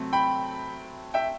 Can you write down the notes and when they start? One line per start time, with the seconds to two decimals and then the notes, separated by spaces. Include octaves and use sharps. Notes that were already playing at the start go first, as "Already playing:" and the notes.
Already playing: C3 F#3 A3 C4
0.13 G5 B5
1.14 E5 G5